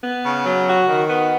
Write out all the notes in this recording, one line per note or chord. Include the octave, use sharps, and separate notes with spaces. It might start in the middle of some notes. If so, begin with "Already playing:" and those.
B3
C#3
F#3
F#4
D#3
B3